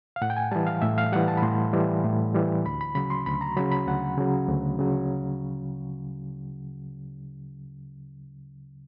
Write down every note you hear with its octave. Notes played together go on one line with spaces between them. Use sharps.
F5
A2 F#5
G5
G#5
E3 G3 A5
F5
A2 E5
F5
E3 G3 F#5
A5
B5
A2 C6
E3 G3
A2
E3 G3
D2 B5
B5
C#3 F#3 B5
C6
D2 B5
A#5
C#3 F#3 B5
B5
D2 F#5
C#3 F#3
D2
C#3 F#3